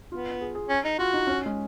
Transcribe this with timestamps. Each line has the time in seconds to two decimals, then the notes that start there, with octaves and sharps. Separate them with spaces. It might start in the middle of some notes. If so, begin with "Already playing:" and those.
0.12 B3 F4
0.41 G#4
0.55 G#4
0.69 C#4
0.84 D#4
0.99 F4 F#4
1.13 D#4
1.27 C#4
1.46 G#3